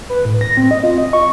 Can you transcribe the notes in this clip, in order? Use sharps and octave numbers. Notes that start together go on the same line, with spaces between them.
B4
A2
A#6
C4
D#5
F4
D#5
C#6